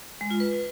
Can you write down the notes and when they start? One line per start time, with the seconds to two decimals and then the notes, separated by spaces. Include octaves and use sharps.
0.21 G#3
0.31 F4
0.40 B4